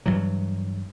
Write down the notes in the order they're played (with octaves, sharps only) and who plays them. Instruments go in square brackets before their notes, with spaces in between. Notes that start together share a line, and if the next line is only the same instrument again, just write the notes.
[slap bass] G2 E3 F#3